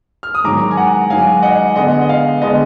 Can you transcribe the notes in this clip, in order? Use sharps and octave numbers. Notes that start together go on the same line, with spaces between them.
F6
D#6
G#2 D#3 F#3 A#5 D6
G#5
F#5 A#5
G#2 D#3 F#3 F5 G#5
D#5 F#5
D3 G#3 B3 D#5 F#5
D#5
F5
D3 G#3 B3 D#5